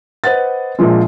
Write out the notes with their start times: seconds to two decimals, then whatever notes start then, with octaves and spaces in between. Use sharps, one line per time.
0.24 B4 C5 D#5 F#5 A6
0.79 A#1 A#2 F3 G#3